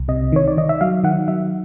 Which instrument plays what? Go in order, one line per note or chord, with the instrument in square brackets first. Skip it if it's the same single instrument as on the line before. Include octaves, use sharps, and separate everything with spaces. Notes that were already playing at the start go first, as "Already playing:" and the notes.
Already playing: [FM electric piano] C2
C3 D#5
D#3 C#5
D5
D#3 D#5
E5
F#3 F5
D#3 F#5
F#3 E5